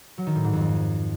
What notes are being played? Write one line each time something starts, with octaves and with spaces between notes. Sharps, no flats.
F#3
D#3
A2
G#2
F2